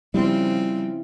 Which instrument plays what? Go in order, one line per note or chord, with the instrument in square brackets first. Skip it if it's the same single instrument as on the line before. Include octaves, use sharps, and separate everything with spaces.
[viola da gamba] C#3 F3 C4 [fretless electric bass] G3 [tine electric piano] E4